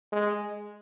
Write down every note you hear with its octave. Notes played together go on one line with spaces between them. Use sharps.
G#3